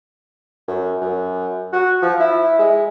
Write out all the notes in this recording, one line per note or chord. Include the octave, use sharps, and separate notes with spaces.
F#2
F#2
F#4
F3
E4
G#3